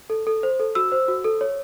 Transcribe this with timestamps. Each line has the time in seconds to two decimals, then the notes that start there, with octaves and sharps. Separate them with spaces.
0.10 A4
0.27 A4
0.43 C5
0.60 A4
0.75 F#4 E6
0.92 C5
1.08 F#4
1.24 A4
1.41 C#5